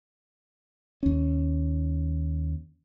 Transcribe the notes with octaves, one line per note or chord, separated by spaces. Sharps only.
D#2 C#4